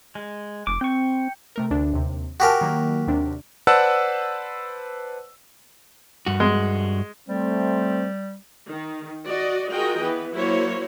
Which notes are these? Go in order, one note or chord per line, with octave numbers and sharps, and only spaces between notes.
G#3
F1 D6
C4 G5 C#6
C3 A3 A#4
D2 D3 D4
D#2 C3
F#4 G4 A#4 G#5 A5
D#3 F#3 A#3
D#2 C3 D4
B4 C5 D5 F#5 A5 E6
G2 F#4
G#3
G3 A3 C4
D#3
F#4 D5 D#5
F4 F#4 G#4 A#4 D#5 G5
E3 B3 B4
F#3 A#3 E4 F#4 C5 C#5